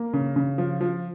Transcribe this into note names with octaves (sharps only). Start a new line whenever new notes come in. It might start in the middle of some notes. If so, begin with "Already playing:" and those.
Already playing: A#3
C#3
C#3
F3
F3